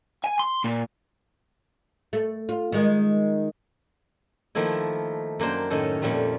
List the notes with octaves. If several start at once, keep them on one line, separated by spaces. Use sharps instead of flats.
G#5
C6
A#2
A3
F4
D#3 G#3
D#3 F3 A3 A#3 E4
F#2 A#3 D4 C5 G5
A2 D#3 C#4 A4
F2 A#2 F3 G3 A3